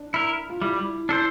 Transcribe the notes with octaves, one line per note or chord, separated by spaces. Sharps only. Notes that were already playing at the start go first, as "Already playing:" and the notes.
Already playing: D4
E4 A#4
F4
G3 E4
D4 A4 C5